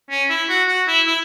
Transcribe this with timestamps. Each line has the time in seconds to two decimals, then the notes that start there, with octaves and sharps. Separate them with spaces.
0.11 C#4
0.30 E4
0.49 F#4
0.68 F#4
0.88 E4
1.07 E4